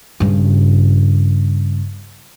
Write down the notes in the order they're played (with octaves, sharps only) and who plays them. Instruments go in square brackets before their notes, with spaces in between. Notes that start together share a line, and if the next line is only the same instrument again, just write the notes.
[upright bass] G2 C#3